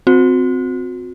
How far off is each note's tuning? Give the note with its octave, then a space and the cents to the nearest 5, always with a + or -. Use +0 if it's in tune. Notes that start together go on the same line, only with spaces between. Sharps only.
C4 -15 F#4 -35